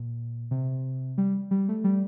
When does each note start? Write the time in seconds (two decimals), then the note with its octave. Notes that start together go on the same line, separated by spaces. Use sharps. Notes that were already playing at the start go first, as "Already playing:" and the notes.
Already playing: A#2
0.51 C3
1.18 G3
1.51 G3
1.69 A3
1.84 G3